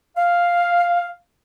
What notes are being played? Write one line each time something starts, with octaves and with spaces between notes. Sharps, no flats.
F5